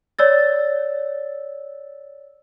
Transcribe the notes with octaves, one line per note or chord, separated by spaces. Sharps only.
C#5 D5 E6 A6